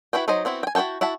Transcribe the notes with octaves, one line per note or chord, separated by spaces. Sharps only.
E4 F#4 B4 G5
F#3 D#4 C5 D#5
B3 C4 E4 F#4
G5 G#5
E4 F#4 A4 G5 A5
E4 F#4 E5 A5